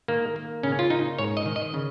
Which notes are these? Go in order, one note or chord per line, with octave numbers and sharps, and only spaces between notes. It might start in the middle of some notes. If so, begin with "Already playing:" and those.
D#3 A#3
A#3
C#3 C#4
F4
A#3 D#4
G#2 C#5
D#5
D#3
D#5
C#3